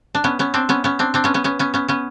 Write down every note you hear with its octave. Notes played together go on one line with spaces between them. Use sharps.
D4
B3 C#4
B3 C#4
C4 D4
B3 C#4
B3 C#4
C4 D4
C4 D4
B3 C#4
B3 C#4
B3 C#4
B3 C#4
B3 C#4
B3 C#4